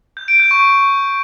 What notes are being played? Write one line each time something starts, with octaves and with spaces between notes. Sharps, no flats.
G6
D7
G6
C#6